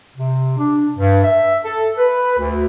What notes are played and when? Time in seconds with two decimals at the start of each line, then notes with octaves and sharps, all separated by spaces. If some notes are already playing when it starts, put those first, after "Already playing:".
0.16 C3
0.58 D4
0.96 G2
1.24 E5
1.65 A4
1.98 B4
2.39 D2